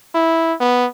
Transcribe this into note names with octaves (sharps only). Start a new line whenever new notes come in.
E4
B3